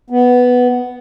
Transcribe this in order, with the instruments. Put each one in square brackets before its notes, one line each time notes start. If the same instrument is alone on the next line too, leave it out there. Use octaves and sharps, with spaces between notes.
[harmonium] B3